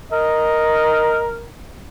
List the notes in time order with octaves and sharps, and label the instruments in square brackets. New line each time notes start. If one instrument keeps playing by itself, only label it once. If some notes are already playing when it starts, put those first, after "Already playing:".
[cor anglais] A#4 [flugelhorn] D#5